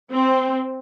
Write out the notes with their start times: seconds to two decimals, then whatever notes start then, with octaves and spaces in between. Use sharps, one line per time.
0.11 C4